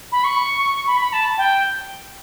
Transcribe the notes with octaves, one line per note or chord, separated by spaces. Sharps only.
B5
C#6
B5
B5
A5
G5